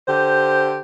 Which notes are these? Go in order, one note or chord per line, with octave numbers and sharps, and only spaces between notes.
D3 G4 C5